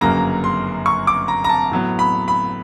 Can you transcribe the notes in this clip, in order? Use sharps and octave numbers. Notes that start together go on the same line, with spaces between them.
G1 F#2 C#3 F#3 A#3 A#5
C6
C#6
D6
A#5
A#5
A5
A2 F#3 B3
B5
B5